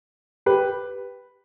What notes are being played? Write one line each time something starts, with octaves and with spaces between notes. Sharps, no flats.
G4 B4